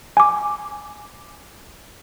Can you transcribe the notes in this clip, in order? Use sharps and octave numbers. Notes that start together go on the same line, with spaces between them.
G#5 D6